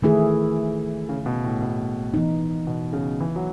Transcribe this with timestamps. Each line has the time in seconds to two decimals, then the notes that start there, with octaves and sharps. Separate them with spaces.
0.02 D#3 E3 A3 E4 G#4
1.09 C#3
1.26 B2
1.44 A2
1.62 B2
2.14 E3 B3 D#4
2.67 B2
2.93 C#3
3.20 E3
3.36 F#3